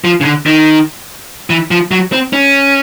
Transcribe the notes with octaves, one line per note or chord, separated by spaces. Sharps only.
F3
C#3
D3
D#3
E3
F3
F#3
C4
C#4